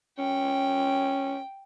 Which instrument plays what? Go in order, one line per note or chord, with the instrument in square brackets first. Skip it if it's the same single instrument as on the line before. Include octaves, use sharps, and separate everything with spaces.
[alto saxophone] C#4 [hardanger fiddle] G5